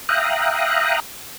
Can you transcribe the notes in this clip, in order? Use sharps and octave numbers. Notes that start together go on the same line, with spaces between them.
E5 F5 G5 A#5 D#6 F#6